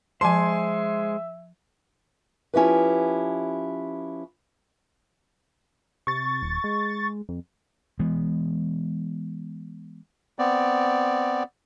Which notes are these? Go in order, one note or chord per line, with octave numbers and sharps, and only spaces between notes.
F3 G#3 C5 E5 G#5 A5 C6
F3 C#4 E4 G4 B4
C3 C#6 A6
D#1
G#3
F2
E3 G#3 B3
B3 C4 D5